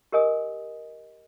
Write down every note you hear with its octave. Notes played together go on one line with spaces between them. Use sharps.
G4 A#4 D#5 G#5 D#6